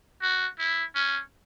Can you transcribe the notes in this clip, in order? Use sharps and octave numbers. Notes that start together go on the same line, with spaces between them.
F#4
E4
C#4